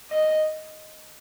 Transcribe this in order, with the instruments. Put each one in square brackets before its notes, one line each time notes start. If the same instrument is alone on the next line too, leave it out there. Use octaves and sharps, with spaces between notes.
[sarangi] D#5